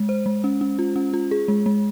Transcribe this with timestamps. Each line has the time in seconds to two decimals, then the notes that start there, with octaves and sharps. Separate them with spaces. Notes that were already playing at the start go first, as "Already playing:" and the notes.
Already playing: G#3
0.09 C5
0.26 G#3
0.44 C#4
0.61 C#4
0.79 F4
0.96 C#4
1.14 F4
1.31 G#4
1.48 G#3
1.66 G#3